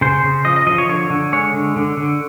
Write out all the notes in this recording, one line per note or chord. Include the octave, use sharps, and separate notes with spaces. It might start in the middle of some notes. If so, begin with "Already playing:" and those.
C#3 C5
C#3
F3 D#5
D#5
F3 D#5
C#5
D3 C#5
D3
G#3 C#5
D3
D3
D3